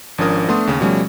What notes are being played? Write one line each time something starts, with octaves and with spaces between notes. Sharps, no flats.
G#1 F3 C#4 D4 A#4 D#6
A3 B3 D4 C6 D#6
D#2 C#3
B2 F3 G3 A3 C#4